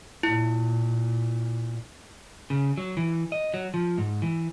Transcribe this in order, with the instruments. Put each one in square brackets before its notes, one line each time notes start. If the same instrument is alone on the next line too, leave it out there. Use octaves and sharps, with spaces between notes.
[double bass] A#2 [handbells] E4
[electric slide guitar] C#3
F#3
E3
D#5
F#3
F3
G#2
E3